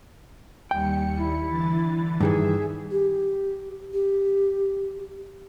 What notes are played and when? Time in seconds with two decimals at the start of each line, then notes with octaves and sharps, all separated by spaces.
0.71 D#2 G3 G5 C#7
1.17 E4
1.48 D3 E3 A6
2.21 G2 D#3 E3 G#4 E5
2.91 G4
3.93 G4